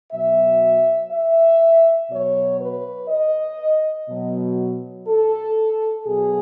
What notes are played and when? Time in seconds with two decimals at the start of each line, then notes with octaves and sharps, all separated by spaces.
0.12 B2 F#3 E5
1.11 E5
2.10 B2 F#3 C#5
2.60 B4
3.09 D#5
4.09 B2 F#3
5.07 A4
6.05 B2 F#3 G#4